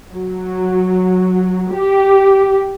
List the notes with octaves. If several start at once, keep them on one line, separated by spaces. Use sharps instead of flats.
F#3
G4